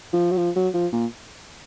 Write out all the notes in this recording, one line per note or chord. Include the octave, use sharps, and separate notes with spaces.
F3
F#3
F3
F#3
F3
A#2